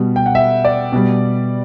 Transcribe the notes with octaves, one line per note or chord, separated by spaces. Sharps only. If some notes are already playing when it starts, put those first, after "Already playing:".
Already playing: B2 G3
G5
F#5
E5
D5
B2 G3